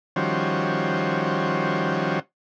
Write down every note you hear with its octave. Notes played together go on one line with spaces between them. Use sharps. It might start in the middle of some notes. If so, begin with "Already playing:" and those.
D#3 F3 G3 C#4 F#4 C5